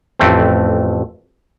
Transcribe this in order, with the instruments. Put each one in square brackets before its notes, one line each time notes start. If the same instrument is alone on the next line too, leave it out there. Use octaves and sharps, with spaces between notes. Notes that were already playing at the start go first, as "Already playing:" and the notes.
[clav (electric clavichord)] A1 F2 A3 C4